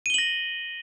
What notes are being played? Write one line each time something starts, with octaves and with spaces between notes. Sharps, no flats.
A#6 D#7 F#7 G7